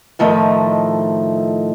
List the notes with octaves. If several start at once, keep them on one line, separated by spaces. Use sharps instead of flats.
A2 D#3 F3 A3 D#5